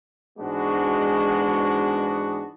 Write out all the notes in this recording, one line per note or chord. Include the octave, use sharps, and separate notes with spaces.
G#2 E3 G#3 B3 D4 F#4